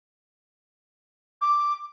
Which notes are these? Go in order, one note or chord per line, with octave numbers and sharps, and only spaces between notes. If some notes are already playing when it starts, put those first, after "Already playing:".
D6